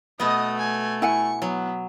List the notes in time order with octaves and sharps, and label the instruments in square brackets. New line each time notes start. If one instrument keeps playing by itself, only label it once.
[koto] B2 B3 [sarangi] A3 [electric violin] D#5 D#6
[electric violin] G#5
[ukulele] E4 F#5 G#5 [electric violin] C#6 C#7
[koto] F#3 [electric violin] B3